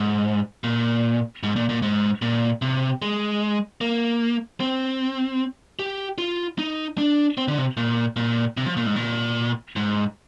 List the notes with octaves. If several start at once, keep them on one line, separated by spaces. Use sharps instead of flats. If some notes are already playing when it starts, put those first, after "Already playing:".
Already playing: G#2
A#2
G#2
A#2
A#2
G#2
A#2
C3
G#3
A#3
C4
G4
F4
D#4
D4
C4
D3
C3
A#2
A#2
C3
F3
A#2
G#2
A#2
G#2